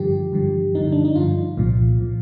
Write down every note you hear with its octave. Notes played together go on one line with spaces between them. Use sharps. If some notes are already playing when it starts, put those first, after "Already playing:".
Already playing: G2 D3 F3 G4
G2 D3 F3
G2 D3 F3 D#4
D4
D#4
G2 D3 F3 F4
C2 A#2 F3
A#2 F3